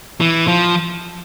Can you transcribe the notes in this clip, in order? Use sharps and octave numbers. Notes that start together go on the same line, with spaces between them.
E3
F3